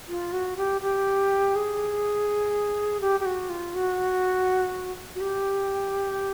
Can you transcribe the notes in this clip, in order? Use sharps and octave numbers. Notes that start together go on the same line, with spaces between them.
F4
F#4
G4
G4
G#4
G4
G4
F#4
F4
F#4
F#4
G4